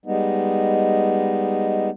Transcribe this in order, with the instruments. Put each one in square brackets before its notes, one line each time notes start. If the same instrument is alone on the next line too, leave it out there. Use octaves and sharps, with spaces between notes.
[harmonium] G3 G#3 B3 D#4